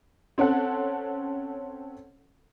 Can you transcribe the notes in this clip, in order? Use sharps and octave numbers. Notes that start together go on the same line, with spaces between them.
C4 C#4 A4 F#5